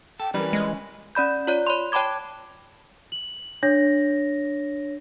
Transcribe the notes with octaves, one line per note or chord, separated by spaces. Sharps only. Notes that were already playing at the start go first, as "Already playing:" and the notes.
A4 G5
E3 G3 C#4 A#4 B4
G#3
C#4 D5 B5 G6
F4 C#5 D5
C#5 B5 C6
C#5 G5 A5 B5 D6 G#6
F#7
D4 C#5 A#6